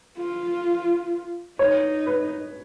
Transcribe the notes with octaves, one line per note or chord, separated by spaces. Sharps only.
F4
D#4 C#5
B4